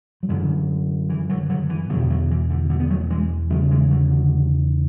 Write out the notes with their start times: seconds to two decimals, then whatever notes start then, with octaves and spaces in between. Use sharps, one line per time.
0.23 F#3
0.29 F#2 D3 E3
1.09 E3
1.30 D3 F#3
1.50 D3 F#3
1.70 E3
1.90 B2 D3 F#3
1.94 E2
2.10 D3 F#3
2.31 E3
2.50 D3
2.70 D3
2.80 B3
2.90 F#3 A3
3.10 E3 G#3
3.50 E2 C#3 F#3 A3
3.71 E3 G#3
3.90 D3 F#3
4.11 D3